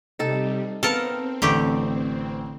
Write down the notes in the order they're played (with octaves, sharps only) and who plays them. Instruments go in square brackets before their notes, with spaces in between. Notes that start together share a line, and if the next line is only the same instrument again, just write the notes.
[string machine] C3 G3 [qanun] D#4 A4 A5
[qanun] B3 F5 [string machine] C4 [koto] A4 A#4 A5
[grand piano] A1 [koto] D3 A3 G4